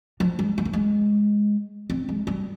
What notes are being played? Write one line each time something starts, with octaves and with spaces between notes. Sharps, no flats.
F3
G#3
G#3
A#3
G#3
C4
G#3
G3